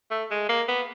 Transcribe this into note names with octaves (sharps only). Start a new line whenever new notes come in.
A3
G#3
A#3
B3